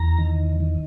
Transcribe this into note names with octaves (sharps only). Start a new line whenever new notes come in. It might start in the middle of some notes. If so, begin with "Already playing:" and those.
Already playing: E2 A#5
D#3
D#3